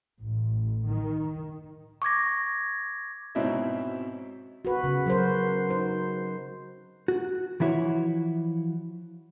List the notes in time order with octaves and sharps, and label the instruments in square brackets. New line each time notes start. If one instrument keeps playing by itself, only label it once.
[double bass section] A1
D#3
[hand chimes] C#6 D6 G#6 A#6
[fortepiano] G#2 B2 C4 C#4 E4 E5
[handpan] F#4 B4
C#3
F#3 A#4 C5
D#4 C5
[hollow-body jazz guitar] F#4
E3 F3 E4 F#4 C#5